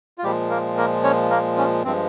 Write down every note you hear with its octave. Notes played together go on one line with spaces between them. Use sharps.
F4
A#2 F3 G3 G#3 G4
A#3 A#4
A#3 A#4
C#4 C#5
A#3 A#4
C#4
G2 F3 G#3 C4